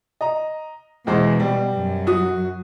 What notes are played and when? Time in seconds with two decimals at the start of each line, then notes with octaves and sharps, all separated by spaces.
0.21 D#5 A#5
1.07 E2 B2 G#3 C5
1.40 G3
1.73 F#2
2.07 F#4 D#6